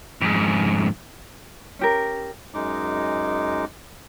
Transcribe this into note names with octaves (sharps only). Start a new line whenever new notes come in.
F2 G#2
C#4 G4 A#4
F#2 G#3 D#4 D6